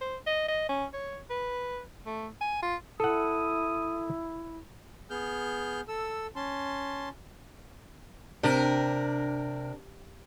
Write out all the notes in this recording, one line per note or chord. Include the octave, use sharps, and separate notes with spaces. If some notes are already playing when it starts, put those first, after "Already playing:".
C5
D#5
D#5
C#4
C#5
B4
A3
G#5
F4
E4 A4 F#5 D#6
B3 G#4 F6 G6
A4 E6
C#4 A5 C6
C3 D4 A#4